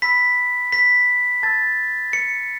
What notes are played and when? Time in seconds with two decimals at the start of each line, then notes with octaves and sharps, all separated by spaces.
0.02 B5 E6 B6
0.72 B6
1.43 A5 E6 A6
2.13 C#7